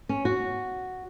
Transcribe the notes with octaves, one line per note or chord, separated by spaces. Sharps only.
C#4
F#4